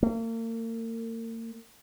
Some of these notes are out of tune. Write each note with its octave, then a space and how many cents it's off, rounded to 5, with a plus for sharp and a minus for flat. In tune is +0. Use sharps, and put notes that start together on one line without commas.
A#3 -40